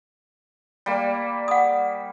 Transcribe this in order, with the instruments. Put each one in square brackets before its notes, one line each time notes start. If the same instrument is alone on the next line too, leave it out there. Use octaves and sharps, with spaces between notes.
[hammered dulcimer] G3 A#3
[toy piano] F#5 D#6